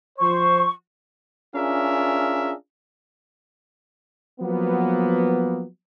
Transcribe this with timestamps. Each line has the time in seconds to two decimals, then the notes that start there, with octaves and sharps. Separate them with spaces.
0.19 F3 C5 C#6
1.54 C#4 D4 F4 G#4 A#4 E5
4.41 F3 F#3 A#3 B3